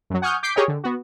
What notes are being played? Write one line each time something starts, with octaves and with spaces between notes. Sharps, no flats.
F#2 F#3
F#5 G#5 C#6 D#6 F6 G6
D6 G6 B6 C7 D7
G4 G#4 A#4 C#5 D#5 G5
D3
B3 F#4